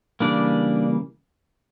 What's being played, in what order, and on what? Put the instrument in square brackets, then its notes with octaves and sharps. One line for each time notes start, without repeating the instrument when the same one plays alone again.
[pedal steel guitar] C#3 E3 G3 A#3 D4 D5